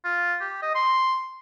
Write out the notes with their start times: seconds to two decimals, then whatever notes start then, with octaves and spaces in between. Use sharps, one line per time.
0.05 F4
0.41 G4
0.62 D#5
0.75 C6